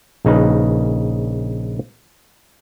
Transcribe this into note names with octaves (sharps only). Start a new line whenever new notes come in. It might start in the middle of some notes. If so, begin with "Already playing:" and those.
A#1 C#3 D#4 B4